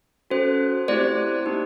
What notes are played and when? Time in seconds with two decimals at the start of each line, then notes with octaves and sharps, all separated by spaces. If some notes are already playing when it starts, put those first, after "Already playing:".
0.30 C#4 F#4 A4 C5
0.88 A3 C4 E4 G4 C5 D5
1.46 A#3 D#4 G4